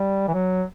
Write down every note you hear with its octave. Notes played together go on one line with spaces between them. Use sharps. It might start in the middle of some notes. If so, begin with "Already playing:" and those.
Already playing: G3
E3
F#3